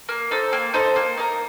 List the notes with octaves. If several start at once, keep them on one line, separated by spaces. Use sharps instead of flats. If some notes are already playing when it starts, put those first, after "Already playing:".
A#3
D#4 A4 C5
A#3
D#4 A4 C5
A#3
D#4 A#4